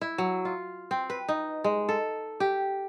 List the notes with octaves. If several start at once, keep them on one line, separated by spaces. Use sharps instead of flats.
E4
F#3
F4
C4
B4
D#4
G#3
A4
G4